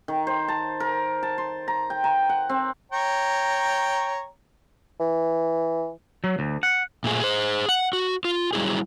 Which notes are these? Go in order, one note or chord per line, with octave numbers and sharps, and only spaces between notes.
D#3
C5
A5
A#4
A5
C6
A#5
G5
A#5
F#5
C4
C#5 G5 A#5
E3
F#3
D2
F#5
A#2 A3 G#4
G#4 C5
F#5
F#4
F4
F#3 G3 E4 G#4